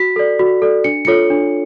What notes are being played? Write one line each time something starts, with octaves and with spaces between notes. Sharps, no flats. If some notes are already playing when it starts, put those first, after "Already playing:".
Already playing: F#4 B6
A4 D5
F#4
A4 D5
D4 C#7
F4 A4 C#5 C#7
D4